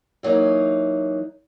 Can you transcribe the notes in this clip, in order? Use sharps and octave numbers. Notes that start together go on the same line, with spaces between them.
E3 F#3 A#3 D#4